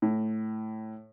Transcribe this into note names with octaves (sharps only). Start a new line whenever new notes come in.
A2